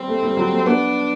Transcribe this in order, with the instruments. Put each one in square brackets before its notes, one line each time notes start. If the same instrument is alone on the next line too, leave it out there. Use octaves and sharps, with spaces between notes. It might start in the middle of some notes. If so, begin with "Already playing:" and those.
Already playing: [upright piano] G3 [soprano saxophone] C4
[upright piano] A3
G3
F#3
A3
[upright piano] B3 [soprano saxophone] D4